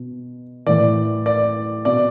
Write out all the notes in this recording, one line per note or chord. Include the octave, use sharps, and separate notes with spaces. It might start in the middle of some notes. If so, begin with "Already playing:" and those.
Already playing: B2
A2 E3 D5
D5
B2 D5